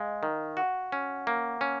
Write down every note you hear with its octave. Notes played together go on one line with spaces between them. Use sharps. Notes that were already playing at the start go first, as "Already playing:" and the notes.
Already playing: G#3 D#5 F5
D#3
F#4 F#5
C#4
A#3
C#4